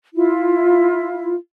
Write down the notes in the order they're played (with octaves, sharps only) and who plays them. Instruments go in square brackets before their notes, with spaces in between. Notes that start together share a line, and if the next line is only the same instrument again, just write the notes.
[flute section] E4 F4